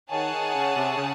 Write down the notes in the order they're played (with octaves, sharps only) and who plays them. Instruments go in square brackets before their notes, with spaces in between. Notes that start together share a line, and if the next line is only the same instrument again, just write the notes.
[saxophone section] D#3 [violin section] G#4 C#5 F#5 A5
[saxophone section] D#3
C#3
C3
C#3